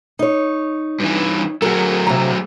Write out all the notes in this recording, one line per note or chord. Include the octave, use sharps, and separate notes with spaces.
D#4 C#5
G2 E3
F#3 A3 G#4 A#4
C3 A#5